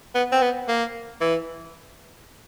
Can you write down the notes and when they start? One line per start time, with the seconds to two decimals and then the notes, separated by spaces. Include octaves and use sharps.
0.15 B3
0.32 C4
0.42 B3
0.68 A#3
1.21 E3